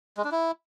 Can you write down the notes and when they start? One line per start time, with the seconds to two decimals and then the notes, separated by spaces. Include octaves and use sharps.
0.17 G#3
0.25 D4
0.32 E4